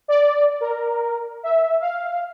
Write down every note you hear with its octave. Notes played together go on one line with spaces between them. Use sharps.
D5
A#4
E5
F5